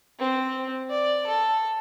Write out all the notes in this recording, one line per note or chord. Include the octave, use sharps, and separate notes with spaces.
C4
D5
A4